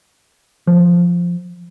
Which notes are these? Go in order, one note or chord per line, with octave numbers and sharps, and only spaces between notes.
F3